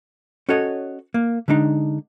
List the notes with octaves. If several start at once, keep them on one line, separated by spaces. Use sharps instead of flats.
C#4 F#4 A4 C#5 D#5
A#3
D3 G#3 D4 D#4